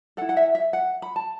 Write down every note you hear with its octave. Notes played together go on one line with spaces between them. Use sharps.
E4 A4 F#5
F#5
E5
E5
F#5
B5
A5